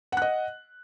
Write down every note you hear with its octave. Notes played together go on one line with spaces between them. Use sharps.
D#5 F#5 F#6